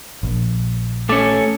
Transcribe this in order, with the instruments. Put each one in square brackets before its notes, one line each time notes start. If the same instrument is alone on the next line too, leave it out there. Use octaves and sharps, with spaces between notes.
[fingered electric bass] A#1
[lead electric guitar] A3 C#4 [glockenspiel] D6